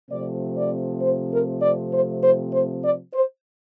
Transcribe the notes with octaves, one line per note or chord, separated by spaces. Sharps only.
C3 F3 A3 C4 D5
D5
C5
A#4
D5
C5
C5
C5
D5
C5